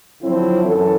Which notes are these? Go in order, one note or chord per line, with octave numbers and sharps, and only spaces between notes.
D3 F3 F#3 C4 E4
F#2 E3 F#3 A4